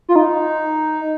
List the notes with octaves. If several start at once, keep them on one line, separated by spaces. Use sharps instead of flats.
F4
D#4